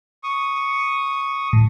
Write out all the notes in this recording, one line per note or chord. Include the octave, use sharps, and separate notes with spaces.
C#6 D#6
A2